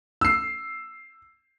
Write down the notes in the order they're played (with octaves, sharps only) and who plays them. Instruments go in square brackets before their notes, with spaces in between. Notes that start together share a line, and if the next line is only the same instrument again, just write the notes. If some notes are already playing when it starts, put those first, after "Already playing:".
[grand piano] E6 C7